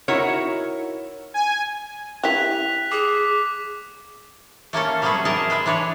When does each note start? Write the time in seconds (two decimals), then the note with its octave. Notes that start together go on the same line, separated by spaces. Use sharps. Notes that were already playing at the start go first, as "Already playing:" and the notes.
0.08 D#4 E4 F#4 A#4 C#5
1.34 G#5
2.23 E4 G4 F#6 B6 F7
2.92 G#4 D6
4.73 A3 A#3 C#4 A4
5.02 F#3 G3 A3 C4 G#4 B4
5.25 G#4 A#4 D#5 E5 G5 A5
5.50 G#3 B4 E5
5.66 E3 D4 B4 C#5